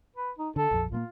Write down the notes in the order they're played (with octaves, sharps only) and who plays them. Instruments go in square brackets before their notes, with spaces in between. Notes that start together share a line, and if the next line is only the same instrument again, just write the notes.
[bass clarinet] B4
D#4
[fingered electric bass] D3 [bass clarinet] A4
[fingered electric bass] A#1 F2
[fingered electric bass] A#2 A3 A#3 [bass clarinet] F4